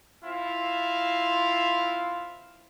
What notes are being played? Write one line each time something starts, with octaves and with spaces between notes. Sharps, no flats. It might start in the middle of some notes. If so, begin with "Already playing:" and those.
C4 E4 F4 F5